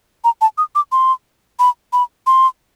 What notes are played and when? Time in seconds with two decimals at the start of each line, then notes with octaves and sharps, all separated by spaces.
0.24 A#5
0.41 A5
0.58 D#6
0.75 D6
0.92 C6
1.59 B5
1.93 B5
2.27 C6